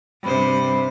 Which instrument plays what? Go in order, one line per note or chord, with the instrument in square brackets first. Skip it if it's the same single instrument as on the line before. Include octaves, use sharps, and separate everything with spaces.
[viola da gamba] G2 C3 C5 [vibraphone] G3 B5